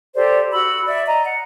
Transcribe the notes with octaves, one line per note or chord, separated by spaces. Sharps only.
G4 A4 C5 D5
F#4 B5 E6
D5 E5
D#5 A#5
F#5